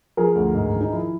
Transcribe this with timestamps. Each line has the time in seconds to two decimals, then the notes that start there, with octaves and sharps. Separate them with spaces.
0.17 F3 G#4 A#4
0.36 D2
0.55 G#2
0.74 D#3
0.81 D#4
0.92 F3 E4